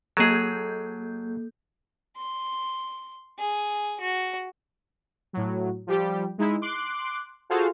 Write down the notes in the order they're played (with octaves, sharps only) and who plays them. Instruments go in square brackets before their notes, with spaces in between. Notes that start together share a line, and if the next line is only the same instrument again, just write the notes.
[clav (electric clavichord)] F#3 G#4 [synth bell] A#3 A4 G6
[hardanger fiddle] C6
G#4
F#4
[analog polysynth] A2 F#3
F3 G3 G4
G#3 D#4 E4
C6 D6 F#6
F4 F#4 G#4 A4 C5 F5